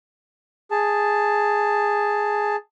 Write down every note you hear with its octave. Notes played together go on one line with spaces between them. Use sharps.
G#4 A5